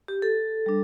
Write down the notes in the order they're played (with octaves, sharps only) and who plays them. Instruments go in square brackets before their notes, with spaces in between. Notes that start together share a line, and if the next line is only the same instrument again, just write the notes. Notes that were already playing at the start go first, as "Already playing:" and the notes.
[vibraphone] G4
A4
G3 D4